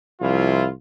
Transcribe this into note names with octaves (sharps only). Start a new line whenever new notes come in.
C2 F3 E4 F4